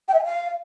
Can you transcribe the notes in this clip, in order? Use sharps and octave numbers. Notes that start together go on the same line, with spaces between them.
G5
E5
G#5
F5